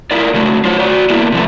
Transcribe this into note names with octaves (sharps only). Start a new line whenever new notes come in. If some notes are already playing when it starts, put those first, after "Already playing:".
E4 F4 A#4 D5
C#3 F#3 A3
F4 C5 C#5
F#4 D5
A#3 B3 E4
C3 F3 A3